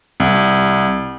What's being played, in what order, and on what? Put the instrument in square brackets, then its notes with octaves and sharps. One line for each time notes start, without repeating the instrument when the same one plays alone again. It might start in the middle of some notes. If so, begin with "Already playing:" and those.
[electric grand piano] C2